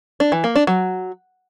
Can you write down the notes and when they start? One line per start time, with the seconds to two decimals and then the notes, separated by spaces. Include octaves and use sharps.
0.20 D4
0.32 E3
0.44 A#3
0.56 D4
0.67 F#3